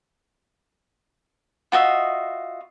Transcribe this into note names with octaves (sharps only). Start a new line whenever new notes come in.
F4 F#4 D#5 E5